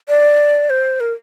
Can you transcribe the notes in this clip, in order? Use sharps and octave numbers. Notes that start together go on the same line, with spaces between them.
D5
C5
A#4